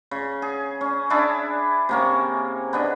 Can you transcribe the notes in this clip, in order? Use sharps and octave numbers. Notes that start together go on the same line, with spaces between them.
C#3
G#4
C#4
D4 E4 G#4 A5
C3 A#3 C#4
B3 D4 D#5